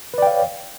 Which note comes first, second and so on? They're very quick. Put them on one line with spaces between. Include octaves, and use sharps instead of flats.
B4 D5 G5 F5 C#5